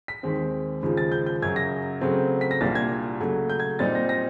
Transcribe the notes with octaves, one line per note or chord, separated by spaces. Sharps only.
B6
D#2 D#3 G#3 C4
D#2 C#3 F3 G#3
A6
G6
G6
F#2 C#3 F#3 G#6
A#6
C#3 F#3 A3 C4
B6
A#6
C2 A#2 G3 A#3 D4 A6
G#6
C#3 F#3 A3
G6
G#6
A#2 G3 C4 D#4 A6
A#6
A#6